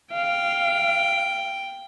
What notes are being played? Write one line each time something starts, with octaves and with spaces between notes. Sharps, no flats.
F5 G5